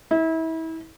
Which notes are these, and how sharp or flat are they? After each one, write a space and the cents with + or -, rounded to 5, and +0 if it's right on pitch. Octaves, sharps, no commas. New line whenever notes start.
E4 -30